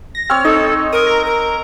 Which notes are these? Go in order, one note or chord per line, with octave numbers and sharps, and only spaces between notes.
A#6
C4 C#5 F6
D#4 A4 D#5
A#4 D#6
A#5
A#4